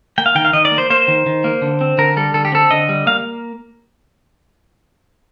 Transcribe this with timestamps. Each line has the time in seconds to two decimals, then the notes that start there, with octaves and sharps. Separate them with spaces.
0.18 A#3 G5
0.26 F5
0.35 D#3 G5
0.45 F5
0.53 D#3 D#5
0.65 D5
0.72 A#3
0.78 C5
0.90 A#3 C5
1.08 D#3
1.26 D#3
1.44 A#3
1.62 D3
1.81 C4
1.98 D3 A#4
2.17 G3 A4
2.34 D3 A4
2.45 G4
2.52 C4 A4
2.71 D3 D#5
2.89 G3
3.07 A#3 F5